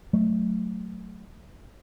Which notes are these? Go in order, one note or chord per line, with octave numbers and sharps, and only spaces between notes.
F#3 A3